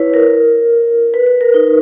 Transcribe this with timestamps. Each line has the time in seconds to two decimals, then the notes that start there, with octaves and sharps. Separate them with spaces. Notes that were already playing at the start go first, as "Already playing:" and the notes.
Already playing: E4 B4 C#5
0.14 A#4
1.14 B4
1.26 B4
1.41 A#4
1.54 D#4